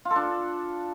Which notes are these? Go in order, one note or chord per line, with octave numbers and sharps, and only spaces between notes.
F4
A4
D4